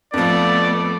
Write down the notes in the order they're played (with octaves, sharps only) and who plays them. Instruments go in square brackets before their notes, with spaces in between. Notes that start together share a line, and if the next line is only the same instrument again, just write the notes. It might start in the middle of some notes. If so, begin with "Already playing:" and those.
[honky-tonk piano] F2 F3 [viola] A3 B3 [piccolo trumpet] D5